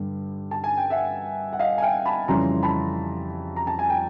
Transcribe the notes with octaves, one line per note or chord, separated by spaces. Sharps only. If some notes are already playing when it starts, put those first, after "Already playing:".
Already playing: G2 D3 G3
A5
G#5
G5
E5 F#5
F#5
D#5 F5
G#5
F5 G5
A5 B5
F2 C#3 E3 G3 A#5 C6
A5 B5
A#5
A5
G#5
G5